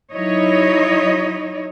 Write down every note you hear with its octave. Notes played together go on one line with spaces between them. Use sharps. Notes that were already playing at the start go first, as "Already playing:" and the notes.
F#3 D#4 E4 C#5 D#5